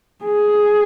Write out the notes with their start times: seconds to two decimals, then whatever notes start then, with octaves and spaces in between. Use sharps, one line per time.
0.24 G#4